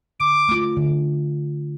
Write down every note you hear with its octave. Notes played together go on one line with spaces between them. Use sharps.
D3 D6
A3 F4
D3